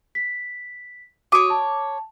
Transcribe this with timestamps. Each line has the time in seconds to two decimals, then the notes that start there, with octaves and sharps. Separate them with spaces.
0.15 B6
1.32 F#4 C#5 D6 D#6 D#7
1.50 A5